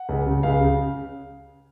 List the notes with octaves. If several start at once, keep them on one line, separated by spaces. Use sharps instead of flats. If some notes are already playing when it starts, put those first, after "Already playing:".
Already playing: F#5
C#2
C#3
C#2 F5
C#3